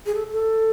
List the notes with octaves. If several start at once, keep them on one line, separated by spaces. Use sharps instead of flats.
G#4
A4
A4